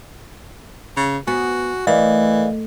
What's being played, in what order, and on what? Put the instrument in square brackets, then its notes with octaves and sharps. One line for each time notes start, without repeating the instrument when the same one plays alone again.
[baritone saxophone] C#3
[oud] B3 [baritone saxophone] F#4 [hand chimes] G#5
[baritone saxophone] E3 [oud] A3 [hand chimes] A#4 D#5 [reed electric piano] D5 F5